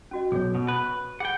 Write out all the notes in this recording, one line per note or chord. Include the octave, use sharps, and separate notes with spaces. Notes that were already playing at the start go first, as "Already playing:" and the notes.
C#4 F#4 D#5
B1 G#4 C#5
B2
B4
C#6
G#4 F#5 G5